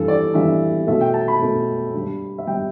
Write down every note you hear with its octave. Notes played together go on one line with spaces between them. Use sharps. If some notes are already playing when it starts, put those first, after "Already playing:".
Already playing: G2 E3 G3 A4
D5
G2 E3 G3 E5
B2 A3 E5
G5
A5
B5
B2 A3
G2 G3
E5
G3 G5